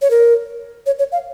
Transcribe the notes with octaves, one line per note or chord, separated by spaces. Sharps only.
C#5
A#4
C#5
C#5
F5